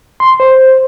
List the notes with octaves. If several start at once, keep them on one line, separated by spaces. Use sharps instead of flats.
C6
C5